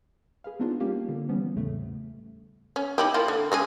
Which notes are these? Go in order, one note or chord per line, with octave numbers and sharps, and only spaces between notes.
G#4 B4 F5
B3 C4 D4 D#4 F4 F#4
G3 A#3 C#4 F4 G4
D3 A#3
E3 F3 G3 B3 C#4
E2 A2 C#3 A3
C#4
D#4 E4 G4
A#3 E4 F4
D3
C#3 G#3 G#4